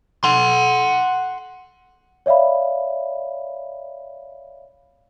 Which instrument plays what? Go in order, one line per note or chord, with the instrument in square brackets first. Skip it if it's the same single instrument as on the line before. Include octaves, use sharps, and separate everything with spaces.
[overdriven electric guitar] F#5 C6
[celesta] C#5 D5 E5 F5 B5